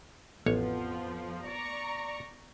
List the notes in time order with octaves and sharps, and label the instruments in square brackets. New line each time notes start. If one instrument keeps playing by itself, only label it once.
[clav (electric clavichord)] A1 C#5 [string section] F2 F3 [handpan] B3
[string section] D5 A#5 C#6